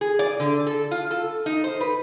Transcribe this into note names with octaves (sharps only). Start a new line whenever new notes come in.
G#4
D5
D3
A4
F4
A4
D#4
C5
B4